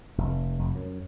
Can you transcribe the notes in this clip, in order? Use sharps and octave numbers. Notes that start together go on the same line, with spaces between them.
F1
F1
F#2